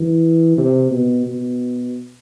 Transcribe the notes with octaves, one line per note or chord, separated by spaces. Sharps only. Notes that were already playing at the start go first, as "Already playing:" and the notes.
Already playing: E3
C3
B2
B2